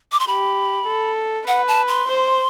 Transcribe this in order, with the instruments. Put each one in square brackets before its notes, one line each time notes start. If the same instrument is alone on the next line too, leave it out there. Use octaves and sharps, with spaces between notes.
[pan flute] D6
C6
[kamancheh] G4 [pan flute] B5
[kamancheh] A4
[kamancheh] B4 [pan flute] F#5
[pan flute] A5
C6
[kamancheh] C5